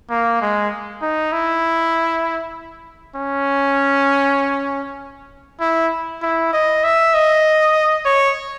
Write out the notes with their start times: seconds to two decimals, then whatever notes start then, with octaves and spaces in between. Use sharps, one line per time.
0.10 A#3
0.41 G#3
1.02 D#4
1.32 E4
3.16 C#4
5.60 E4
6.22 E4
6.53 D#5
6.84 E5
7.14 D#5
8.06 C#5